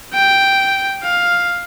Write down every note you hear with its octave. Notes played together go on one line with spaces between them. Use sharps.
G5
F5